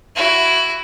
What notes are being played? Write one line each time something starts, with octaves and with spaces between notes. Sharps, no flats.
E4 F#4